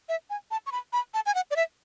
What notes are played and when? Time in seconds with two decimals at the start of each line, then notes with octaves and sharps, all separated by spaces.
0.09 E5
0.30 G#5
0.51 A5
0.66 C#6
0.72 B5
0.93 B5
1.14 A5
1.26 G#5
1.35 F#5
1.51 D5
1.56 E5